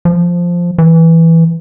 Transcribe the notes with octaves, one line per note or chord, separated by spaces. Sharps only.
F3
E3